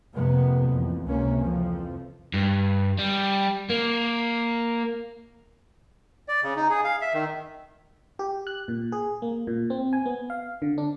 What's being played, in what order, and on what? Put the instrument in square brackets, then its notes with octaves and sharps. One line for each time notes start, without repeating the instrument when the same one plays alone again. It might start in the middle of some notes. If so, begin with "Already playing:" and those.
[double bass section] F2 C3 A#3 B3
A1 F2
C#2 C3 A#3 C#4
F2 E3 F3
[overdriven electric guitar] G2
G3
A#3
[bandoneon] D5
C#3
D#4
G#4
F5
E5
D#3
[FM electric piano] G4
F#6
A#2
G#4
A#3
A#2
C4
G#5
B3
F5
D3
D4